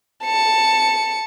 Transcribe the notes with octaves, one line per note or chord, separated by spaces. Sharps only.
A5 C#7